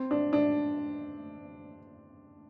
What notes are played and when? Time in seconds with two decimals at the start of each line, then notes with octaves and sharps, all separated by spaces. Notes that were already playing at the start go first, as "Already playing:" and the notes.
Already playing: C4
0.11 D4
0.33 D4